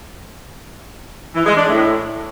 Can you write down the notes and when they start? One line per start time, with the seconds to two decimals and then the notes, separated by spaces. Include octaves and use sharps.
1.35 E3
1.46 G#3
1.56 D4
1.67 A2